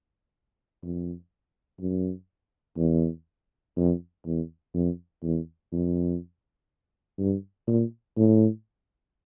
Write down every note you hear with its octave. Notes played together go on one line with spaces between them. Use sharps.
F2
F#2
E2
F2
E2
F2
E2
F2
G2
A#2
A2